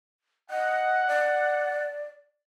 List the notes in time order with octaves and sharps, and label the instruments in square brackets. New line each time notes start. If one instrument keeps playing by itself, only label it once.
[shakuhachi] D#5 [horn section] F#5
[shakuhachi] D5